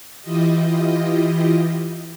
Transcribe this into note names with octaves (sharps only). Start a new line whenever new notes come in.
E3 E4 F4 G4 D#5